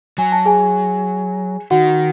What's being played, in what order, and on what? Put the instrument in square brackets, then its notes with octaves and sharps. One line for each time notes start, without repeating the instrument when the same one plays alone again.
[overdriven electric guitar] F#3 [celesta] G#5
[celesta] A5
G#4 G#5
[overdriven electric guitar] D#3 [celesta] F#4 F#5